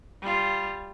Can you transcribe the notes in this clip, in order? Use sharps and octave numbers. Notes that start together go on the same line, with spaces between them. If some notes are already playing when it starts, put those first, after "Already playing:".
G3 F4